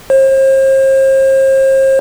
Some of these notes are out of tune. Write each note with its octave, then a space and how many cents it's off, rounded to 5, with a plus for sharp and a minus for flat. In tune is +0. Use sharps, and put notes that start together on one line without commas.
C5 +40